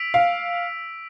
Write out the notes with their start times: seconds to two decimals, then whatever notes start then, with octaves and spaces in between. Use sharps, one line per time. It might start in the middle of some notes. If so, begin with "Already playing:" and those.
Already playing: E6 B6 D7 F7
0.14 F5